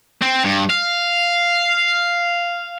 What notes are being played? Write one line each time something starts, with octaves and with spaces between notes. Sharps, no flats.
C4
G2
F5